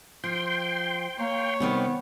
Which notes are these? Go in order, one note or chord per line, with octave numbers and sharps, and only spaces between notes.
F3 G5 C6
A#3 C#5
C3 D#3 G3 B3